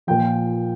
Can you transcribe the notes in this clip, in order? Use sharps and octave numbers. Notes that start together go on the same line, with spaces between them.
A#2 F3 G5